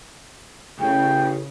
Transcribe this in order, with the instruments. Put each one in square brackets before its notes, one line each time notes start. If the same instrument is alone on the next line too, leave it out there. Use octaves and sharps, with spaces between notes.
[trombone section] A1 [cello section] C#3 [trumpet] G5